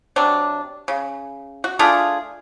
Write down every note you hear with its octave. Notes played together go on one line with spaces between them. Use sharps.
C3 F#3 D4
C#3
F#4
A3 D4 F4 G#4